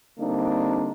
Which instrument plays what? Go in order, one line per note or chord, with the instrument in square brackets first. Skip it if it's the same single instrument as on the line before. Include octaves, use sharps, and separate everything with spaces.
[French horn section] D3 G3 A#3 C4 D4 D#4